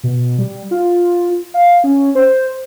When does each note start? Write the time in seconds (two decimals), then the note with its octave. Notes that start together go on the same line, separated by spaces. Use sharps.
0.03 B2
0.38 G3
0.71 F4
1.54 F5
1.84 C#4
2.15 C5